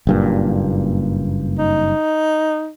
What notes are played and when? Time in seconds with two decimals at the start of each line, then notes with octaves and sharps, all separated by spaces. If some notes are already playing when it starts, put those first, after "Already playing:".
0.07 F#1 G2 A#2
1.58 D#4